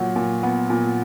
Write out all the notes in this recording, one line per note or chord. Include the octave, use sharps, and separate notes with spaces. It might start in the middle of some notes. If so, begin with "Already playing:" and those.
Already playing: A#2 F#3
A#2
B3
A#2